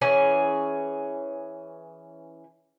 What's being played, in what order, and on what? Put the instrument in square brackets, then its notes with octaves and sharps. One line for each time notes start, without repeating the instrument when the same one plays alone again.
[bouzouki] E3 C#4 G#4 C#5